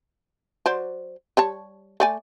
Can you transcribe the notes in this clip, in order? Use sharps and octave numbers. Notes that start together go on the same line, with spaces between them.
F#3 C5 D5
G3 C#5 A5
A3 D5 G#5